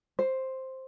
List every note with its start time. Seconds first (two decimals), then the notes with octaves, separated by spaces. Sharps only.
0.19 C5